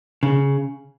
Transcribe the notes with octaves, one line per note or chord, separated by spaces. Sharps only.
C#3